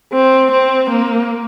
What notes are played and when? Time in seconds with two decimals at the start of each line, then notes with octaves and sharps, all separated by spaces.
0.13 C4
0.52 C4
0.90 A#3